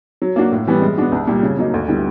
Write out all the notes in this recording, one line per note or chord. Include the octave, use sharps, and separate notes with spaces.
F#3
A#3 D4 F#4
A2
E3 G3 B3
G#3
B3 D4 F#4
C2
A#2 G3
C#3
F#3 A#3 D#4
D2
D3 G3 B3 E4